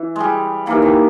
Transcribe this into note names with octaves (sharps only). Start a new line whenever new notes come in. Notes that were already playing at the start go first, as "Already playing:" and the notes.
Already playing: E3
G3 G#3
E3 A#3 D#4 G4 A#4
D#3